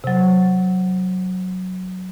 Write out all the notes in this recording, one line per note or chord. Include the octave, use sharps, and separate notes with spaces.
C3 F#3